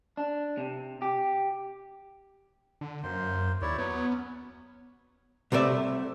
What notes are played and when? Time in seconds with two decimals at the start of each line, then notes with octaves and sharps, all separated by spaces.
0.17 D4
0.58 C3
1.02 G4
2.81 D3
3.03 F#2 A#3 C5 C6
3.62 D#2 E4 C#5 D5
3.78 F#3 B3 C#5
4.09 C#4
5.52 C2 C3 A3 D5 E5